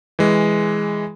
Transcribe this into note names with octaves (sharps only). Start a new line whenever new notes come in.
E3 G#3